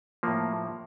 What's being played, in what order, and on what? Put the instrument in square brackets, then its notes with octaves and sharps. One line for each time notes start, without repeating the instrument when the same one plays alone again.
[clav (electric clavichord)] A2 F3 A#3